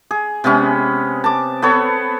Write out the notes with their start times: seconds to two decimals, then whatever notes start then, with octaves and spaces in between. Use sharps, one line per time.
0.11 G#4
0.44 C3 G#3 B3 C#4
1.24 A5 D6
1.62 B3 A4 C#5